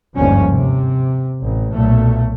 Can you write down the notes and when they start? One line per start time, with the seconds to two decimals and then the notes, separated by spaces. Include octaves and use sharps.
0.16 G1 D#2 G#2 B2 F3 C#4
0.49 C3
1.40 A1
1.73 B1 A#2 A3